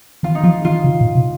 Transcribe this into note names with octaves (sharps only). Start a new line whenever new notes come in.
D#3 F4
D#4
F3 F4
D#3 F4
C#3
A#2
C3